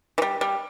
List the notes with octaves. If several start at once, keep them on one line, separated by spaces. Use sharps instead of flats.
E3
G3
G3